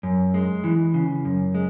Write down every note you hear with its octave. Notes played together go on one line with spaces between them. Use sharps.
F#2
G#3
E3
C#3
F#2
G#3